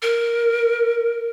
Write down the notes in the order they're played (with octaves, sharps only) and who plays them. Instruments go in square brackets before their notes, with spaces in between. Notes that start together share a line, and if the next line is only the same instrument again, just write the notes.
[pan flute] A#4